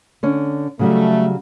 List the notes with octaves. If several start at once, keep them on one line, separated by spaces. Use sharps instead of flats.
D3 C#4
C#3 F#3 G3 A3